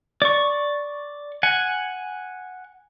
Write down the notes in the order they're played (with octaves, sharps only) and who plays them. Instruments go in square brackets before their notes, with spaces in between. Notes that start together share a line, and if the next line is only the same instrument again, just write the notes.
[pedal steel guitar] D5 C#6
F#5 G#5